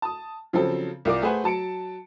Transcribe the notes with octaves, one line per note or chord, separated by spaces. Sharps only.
A5 D#6
C#3 F3 F#3 C4 A4
C2 F4 A#4 D5 D6
A3 G#4 B4 C5 F#5 G#5
F#3 A5 C#7 D7